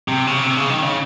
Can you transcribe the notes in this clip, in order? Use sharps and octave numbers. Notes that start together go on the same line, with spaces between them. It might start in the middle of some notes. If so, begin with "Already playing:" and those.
C3
C#3
C3
C#3
D#3
C#3